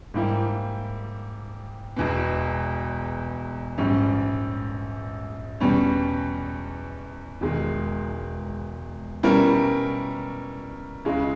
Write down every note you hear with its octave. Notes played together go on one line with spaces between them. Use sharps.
G#2 G3 A#3 E4 G4
E1 E2 B2
A#1 G#2 G3 C#4
E2 B2 G3 C#4
E1 E2 D#3 G#3
B2 G3 C#4 E4 A#4
C#2 C#3 G#3 C#4 E4